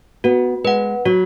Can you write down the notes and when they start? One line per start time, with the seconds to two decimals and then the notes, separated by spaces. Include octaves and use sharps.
0.24 B3 F#4
0.64 G#3 B4 F#5
1.06 F#3 F#4